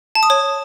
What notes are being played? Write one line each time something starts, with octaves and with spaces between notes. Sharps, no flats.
A5
D#6
C#5